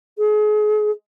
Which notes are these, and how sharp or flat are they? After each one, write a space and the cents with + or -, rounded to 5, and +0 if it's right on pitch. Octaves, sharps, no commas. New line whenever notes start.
G#4 +35